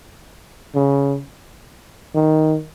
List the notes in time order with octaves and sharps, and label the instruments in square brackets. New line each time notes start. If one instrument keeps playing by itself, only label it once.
[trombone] C#3
D#3